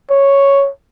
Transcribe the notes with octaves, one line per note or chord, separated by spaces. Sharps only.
C#5